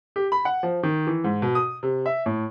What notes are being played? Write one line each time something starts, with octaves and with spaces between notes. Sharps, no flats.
G4
B5
F#5
F3
D#3
E3
G#2
B2
D#6
C3
E5
A2